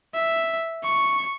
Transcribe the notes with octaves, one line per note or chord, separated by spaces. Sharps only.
E5
C#6